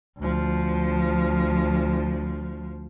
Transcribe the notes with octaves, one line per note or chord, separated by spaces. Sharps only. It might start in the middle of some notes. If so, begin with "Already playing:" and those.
D2 F3